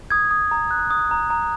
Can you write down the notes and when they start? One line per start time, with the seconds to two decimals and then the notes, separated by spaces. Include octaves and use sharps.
0.10 D#6 G#6
0.31 D#6
0.51 A#5
0.71 F#6
0.91 D#6
1.11 A#5
1.30 A#5